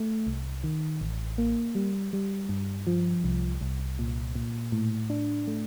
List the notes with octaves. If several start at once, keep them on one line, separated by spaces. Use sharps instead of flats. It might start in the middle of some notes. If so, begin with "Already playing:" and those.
Already playing: A3
C2
D#3
A1
A#3
G3
G3
G2
F3
C2
C2
A#2
A#2
A2
D4
A3